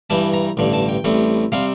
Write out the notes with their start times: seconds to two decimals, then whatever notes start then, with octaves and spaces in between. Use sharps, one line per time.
0.10 G2 E3 G3 A5
0.34 A#5
0.57 A1 G2 D3
0.73 A5
0.89 G5
1.04 A1 A2 G3 C4
1.52 C3 G3 C4 F5